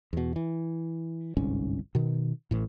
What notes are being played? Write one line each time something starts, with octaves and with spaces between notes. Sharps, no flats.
E2 B2
E3
G1 C2 G#2 C#4
B2 D#3
A1 A2